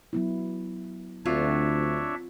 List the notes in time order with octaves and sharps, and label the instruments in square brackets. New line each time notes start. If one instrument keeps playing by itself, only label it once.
[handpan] F#3 B3 E4
[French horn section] D2 [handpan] C4 [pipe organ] D4 C#5 E5 [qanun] F4 F#4